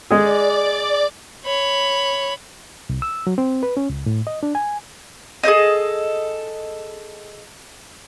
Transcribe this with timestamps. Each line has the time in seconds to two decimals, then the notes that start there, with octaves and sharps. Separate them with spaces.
0.10 G#3 G#4 D5 D6
1.44 C#5 B5
2.89 C2
3.02 E6
3.27 F#3
3.38 C4
3.63 B4
3.77 C#4
3.90 C#2
4.06 A2
4.27 D#5
4.43 D4
4.55 G#5
5.43 G#4 A4 C5 D#5